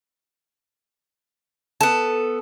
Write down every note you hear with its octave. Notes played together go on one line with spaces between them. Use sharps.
B3 A4